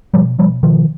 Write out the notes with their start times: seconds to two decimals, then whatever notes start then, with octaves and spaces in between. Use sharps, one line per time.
0.14 B2 F3 G3
0.39 B2 F3 G3
0.63 B2 D#3 F3